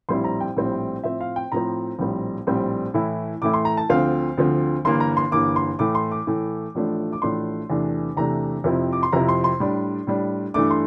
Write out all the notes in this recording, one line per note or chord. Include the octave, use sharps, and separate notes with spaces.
A#1 A2 G3 C4 E4 C6
A#5
G5
A#1 A2 G3 C4 E4
A2 F3 C4 E5
F5
G5
A2 F3 C4 A#5
A#1 A2 G3 C4
A#1 A2 G3 C4
A2 E3 A3 E4
A2 E3 A3 E4 D6
C6
A#5
A5
D2 D3 F3 C4 F5
D2 D3 F3 C4
G1 G2 E3 A#3 C6
A#5
C6
G1 G2 E3 A#3 D6
C6
A2 E3 A3 D6
C6
D6
A2 E3 A3
A1 A2 F3 A3 D4
D6
A1 A2 F3 A3 D4 C6
E2 C3 E3 A3 D4
E2 C3 E3 A3 D4 A#5
F2 C3 F3 C4 E4
D6
C6
F2 C3 F3 C4 E4 A#5
C6
C6
A2 G3 D4
A2 G3 D4
G2 E3 A3 D4 D6
C6